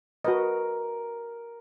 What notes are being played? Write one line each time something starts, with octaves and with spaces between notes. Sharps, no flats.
F#4 A#4 B4 D#5